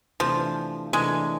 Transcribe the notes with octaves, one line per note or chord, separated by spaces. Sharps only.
C3 E3 F3 A3 D4
C3 E3 G#3 A3 D4